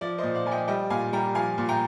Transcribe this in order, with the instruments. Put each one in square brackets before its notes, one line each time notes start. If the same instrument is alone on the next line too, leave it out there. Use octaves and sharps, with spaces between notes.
[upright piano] F3 D5
A#2 C5 D#5
D5 F5
F3 G#5
D#5 G5
G3 D#5 G5
A#2 F5 G#5
G3 G5 A#5
F3 F5 G#5
A#2
G5 A#5